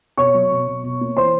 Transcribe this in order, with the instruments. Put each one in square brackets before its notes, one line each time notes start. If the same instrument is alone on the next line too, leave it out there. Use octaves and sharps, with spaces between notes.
[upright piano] B2 C#5 C#6
F#3
B2
B2
B2
A#3
E3 C5 C6